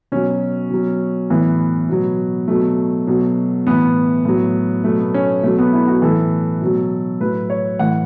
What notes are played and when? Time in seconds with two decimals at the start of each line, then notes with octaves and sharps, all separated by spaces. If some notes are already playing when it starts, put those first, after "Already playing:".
0.12 B2 F#3 C#4
0.71 B2 F#3
1.30 A2 E3 B3
1.89 B2 F#3
2.48 B2 F#3 A3
3.07 B2 F#3
3.67 A2 E3 B3
4.25 A2 F#3
4.84 B2 F#3 A3
4.99 B3
5.14 C#4
5.43 B2 F#3 A3
5.59 B3
5.73 E4
5.87 F#4
6.02 A2 E3 A4
6.62 B2 F#3
7.21 A2 F#3 B4
7.50 C#5
7.79 A2 E3 F#5